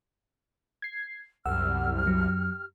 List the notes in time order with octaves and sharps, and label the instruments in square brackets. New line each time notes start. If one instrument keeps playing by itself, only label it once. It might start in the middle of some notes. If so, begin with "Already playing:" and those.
[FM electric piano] G#6 C7
[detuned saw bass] C2 [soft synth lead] F#2 [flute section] G4 F6 [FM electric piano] F#5 E6
[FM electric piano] F#3